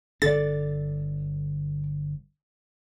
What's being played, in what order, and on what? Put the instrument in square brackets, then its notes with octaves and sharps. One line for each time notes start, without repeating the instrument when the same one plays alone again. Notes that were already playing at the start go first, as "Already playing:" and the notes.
[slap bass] G1 D3 D4 [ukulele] A4 D5 [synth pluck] A6